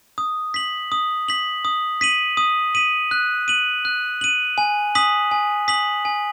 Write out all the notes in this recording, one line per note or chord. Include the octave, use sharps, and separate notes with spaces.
D#6
B6 F#7
D#6
B6 F#7
D#6
B6 D#7 F#7
D#6
B6 D#7 F#7
F#6
D#7 F#7
F#6
D#7 F#7
G#5
D#6 B6 F#7
G#5
D#6 B6 F#7
G#5